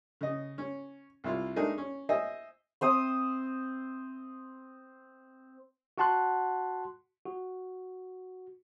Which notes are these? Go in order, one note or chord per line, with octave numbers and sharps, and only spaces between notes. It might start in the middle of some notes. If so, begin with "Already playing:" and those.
C#3 D#5
C#4
C2 E4 F4
G#3 A3 D4 D#4 G#4 A#4
C#4
C5 D#5 E5 G#5
C4 C5 D#6
F#4 F#5 A5 C6 F#6
F#4